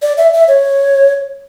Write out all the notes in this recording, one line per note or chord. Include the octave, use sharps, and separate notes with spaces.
D5
E5
E5
C#5